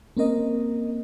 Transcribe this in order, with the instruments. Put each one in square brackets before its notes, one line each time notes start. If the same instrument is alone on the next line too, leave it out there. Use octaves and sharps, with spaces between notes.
[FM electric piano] A#3 C4 C#4 A#4 D#5